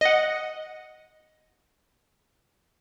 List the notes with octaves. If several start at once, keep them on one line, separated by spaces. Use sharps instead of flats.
D#5 F#5